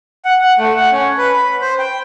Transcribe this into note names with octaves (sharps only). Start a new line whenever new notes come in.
F#5
F#5
A3
F#5
C#4
B4
B5
C5
G5